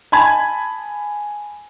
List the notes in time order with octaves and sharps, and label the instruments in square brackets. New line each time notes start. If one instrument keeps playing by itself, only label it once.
[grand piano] G#5 A5 B5 G#6